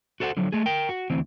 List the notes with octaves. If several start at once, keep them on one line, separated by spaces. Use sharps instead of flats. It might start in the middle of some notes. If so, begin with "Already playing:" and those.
F#4 A4 C5 E5 F#5
D3 F3 F#3
A3 G#4
A#4 G5
F#4
D2 E3 C4